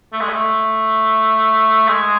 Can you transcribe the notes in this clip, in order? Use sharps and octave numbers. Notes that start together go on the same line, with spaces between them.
A3
G#3
A3
G#3